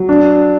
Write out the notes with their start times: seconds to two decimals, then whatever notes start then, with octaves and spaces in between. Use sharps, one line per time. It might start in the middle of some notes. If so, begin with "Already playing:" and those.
Already playing: F#3
0.09 D4